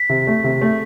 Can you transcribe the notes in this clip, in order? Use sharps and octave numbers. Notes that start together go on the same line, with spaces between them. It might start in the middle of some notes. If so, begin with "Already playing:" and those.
Already playing: B6
C3
A3
C3
A3